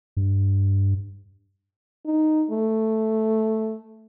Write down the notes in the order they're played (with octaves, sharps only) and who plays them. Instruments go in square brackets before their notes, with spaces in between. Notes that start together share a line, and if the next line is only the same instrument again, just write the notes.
[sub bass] G2
[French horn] D#4
A3